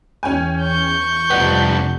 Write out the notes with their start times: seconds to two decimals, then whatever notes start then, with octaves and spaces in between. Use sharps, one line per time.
0.23 E2 C#4 G5 G#5
0.61 C#6 G6
1.30 F1 F2 C3 B3 D4 F#5